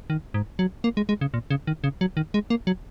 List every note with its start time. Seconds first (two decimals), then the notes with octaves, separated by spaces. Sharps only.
0.10 D#3
0.34 G#2
0.59 F#3
0.84 A#3
0.97 G#3
1.09 G#3
1.21 C#3
1.34 A#2
1.50 C#3
1.67 D#3
1.84 C#3
2.01 F#3
2.17 D#3
2.34 G#3
2.50 A#3
2.67 F#3